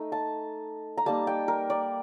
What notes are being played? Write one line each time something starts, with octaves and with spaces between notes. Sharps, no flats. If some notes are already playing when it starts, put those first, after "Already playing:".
Already playing: A3 D#4
A5
A#5
G3 A#3 D#4 A5
G5
A#4
D5